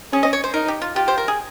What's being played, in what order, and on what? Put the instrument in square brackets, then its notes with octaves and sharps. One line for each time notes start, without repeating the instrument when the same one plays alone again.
[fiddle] C#4 [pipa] G#4
[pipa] D#5
C#5
C5
[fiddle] D#4 [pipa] A#4
[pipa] G4
F4
[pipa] F4 [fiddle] G4
[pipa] C5
A#4
G#4